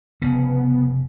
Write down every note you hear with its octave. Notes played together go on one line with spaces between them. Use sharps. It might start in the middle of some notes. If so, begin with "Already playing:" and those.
F1 C#3 B3